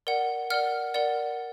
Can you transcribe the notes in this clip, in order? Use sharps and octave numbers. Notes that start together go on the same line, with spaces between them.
A#4 D5 F#5
A#4 D5 F#5 F6
A#4 D5 F#5